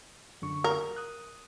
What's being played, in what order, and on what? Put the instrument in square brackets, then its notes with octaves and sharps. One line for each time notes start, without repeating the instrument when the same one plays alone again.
[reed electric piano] F#2 D3 C#6
[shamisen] A#4
[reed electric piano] D#6 F#6